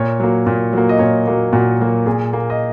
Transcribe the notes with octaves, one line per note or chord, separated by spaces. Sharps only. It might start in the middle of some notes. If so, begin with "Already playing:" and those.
Already playing: A#2 C#5
F#3 A#3
A#2
F#3 A#3
D#5
A#2 C#5
F#3 A#3
A#2 F#4
F#3 A#3
A#2 G#4
A#3
D#5